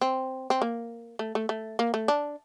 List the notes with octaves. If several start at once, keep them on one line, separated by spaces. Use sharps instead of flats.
C4
C4
A#3
A3
A3
A3
A#3
A3
D4